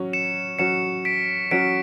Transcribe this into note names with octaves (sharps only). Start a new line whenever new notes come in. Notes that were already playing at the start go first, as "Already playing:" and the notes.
Already playing: F#3 C#4 F#4
C#7 E7
F#3 C#4 F#4 C#7 E7
B6 D7
F#3 C#4 F#4 B6 D7